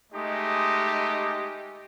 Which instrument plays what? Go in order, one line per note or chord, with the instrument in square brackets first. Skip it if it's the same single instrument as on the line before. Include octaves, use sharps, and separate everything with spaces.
[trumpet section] G#3 A3 D#4 G4 D#5